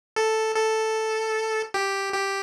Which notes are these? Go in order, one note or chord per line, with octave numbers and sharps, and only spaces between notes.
A4
A4
G4
G4